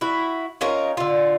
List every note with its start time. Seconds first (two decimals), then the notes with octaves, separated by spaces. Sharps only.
0.01 E4 F#4
0.61 C#4 D#4 F4 A#4
0.97 D3 F4